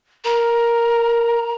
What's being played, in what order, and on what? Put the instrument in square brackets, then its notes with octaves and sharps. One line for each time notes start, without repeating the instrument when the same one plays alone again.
[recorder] A#4 [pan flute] A#5